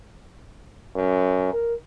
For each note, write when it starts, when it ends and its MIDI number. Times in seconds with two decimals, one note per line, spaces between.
0.96 1.50 42
1.53 1.74 70